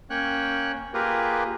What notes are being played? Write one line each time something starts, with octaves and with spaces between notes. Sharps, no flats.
A#3 C#4 C#5 G5 F#6
A#3 F4 G4 G#4 A#4 B4